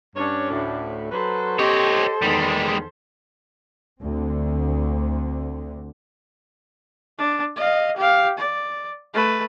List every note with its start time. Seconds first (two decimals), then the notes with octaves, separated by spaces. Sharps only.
0.16 G2 C#4 D4 C#5
0.50 D2 A2
1.11 F#3 A4 B4 C5
1.59 C4 G4 C#5 D#5
2.23 E2 D#3 G3 G#3
4.02 D2 D3 C4
7.18 D4
7.56 D#5 F5
7.97 G4 F5
8.38 D5
9.14 A3 B4